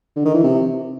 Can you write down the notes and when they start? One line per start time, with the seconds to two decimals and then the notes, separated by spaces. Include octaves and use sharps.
0.16 D3
0.25 D#3
0.34 E3
0.43 C3